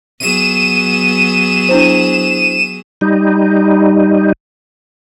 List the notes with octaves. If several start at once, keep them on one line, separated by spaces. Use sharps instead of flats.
F#3 B3 G#4 D#7 E7
D4 E4 C5
G3 D#4